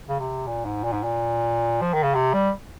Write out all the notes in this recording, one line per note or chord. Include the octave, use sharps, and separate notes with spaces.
C#3
C3
A#2
G#2
A#2
G#2
A#2
F3
D#3
C#3
C3
G3